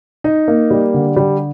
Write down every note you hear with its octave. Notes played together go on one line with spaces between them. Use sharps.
D#4
A#3
G3
D3
G3